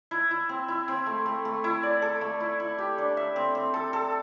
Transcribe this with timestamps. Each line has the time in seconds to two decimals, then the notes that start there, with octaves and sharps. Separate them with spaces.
0.11 E4
0.31 E4
0.49 C4
0.68 E4
0.88 C4
1.06 A3
1.26 A3
1.45 A3
1.64 E4
1.83 D5
2.02 A4
2.21 A3
2.40 E4
2.60 E4
2.78 G4
2.98 D4
3.17 E5
3.36 C4
3.55 C4
3.74 A4
3.93 A4